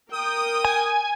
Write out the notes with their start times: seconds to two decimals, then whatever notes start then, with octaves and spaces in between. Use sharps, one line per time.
0.12 A#4 G5 D#6
0.65 G#5